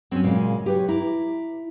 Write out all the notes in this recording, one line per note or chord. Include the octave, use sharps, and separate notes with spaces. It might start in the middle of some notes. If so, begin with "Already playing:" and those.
F#3 C4 C#4
A#2 C#3 G#3
G4 B4 C#5
E4 A#5 D6